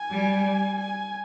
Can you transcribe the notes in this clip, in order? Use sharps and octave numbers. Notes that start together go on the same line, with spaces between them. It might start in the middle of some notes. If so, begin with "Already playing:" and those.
Already playing: G#5
G3
G#5